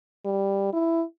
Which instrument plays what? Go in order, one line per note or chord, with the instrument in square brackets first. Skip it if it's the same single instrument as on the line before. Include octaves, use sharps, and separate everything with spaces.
[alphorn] G3
E4